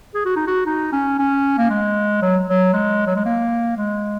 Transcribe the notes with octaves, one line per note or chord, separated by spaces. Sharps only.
G#4
F#4
D#4
F#4
D#4
C#4
C#4
A#3
G#3
F#3
F#3
G#3
F#3
G#3
A#3
G#3